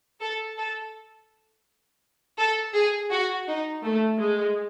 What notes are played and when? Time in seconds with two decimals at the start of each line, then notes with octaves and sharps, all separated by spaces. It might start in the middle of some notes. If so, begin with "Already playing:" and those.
0.21 A4
0.58 A4
2.38 A4
2.75 G#4
3.11 F#4
3.47 D#4
3.84 A3
4.20 G#3